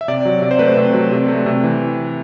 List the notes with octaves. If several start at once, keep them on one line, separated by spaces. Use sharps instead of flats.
E5
C3 D5
F#3
C3 D5
C5
A3 B4
C5
C3
F#3
C3
A3
C3
E3